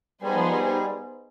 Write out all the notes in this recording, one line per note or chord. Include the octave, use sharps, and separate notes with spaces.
G3 B3 D#4 G#4 C5
F3
G3